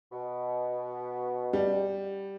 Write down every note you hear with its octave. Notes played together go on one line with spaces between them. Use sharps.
B2
G3